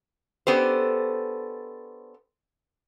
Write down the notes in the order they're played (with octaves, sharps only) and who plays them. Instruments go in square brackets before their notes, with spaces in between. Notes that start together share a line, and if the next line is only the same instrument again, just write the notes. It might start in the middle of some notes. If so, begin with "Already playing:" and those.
[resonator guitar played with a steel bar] B3 C#4 D4 G4 A4 C5